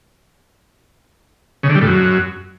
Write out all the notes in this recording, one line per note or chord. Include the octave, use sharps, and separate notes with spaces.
C#3
D3
G3
A2
F#2